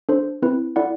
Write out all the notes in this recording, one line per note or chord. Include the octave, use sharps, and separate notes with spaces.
D4 A4 C5
C4 E4 B4
E4 A4 D5 F#5